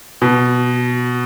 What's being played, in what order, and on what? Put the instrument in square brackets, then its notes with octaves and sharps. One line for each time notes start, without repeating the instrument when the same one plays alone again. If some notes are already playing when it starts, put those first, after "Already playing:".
[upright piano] B2